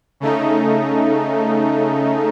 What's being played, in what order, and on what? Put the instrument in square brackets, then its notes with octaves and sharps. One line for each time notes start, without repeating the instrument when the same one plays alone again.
[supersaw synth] C#3 A3 D#4